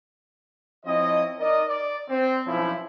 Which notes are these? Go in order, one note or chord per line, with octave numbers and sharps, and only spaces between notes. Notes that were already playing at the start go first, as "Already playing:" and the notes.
F3 C4 E4 F4 C#5 D#5
D#4 A#4 D5 D#5
D5
C4
B1 F3 C#4 E4